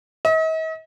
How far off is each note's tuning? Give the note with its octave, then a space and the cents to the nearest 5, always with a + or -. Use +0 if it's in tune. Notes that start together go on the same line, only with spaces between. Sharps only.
D#5 +45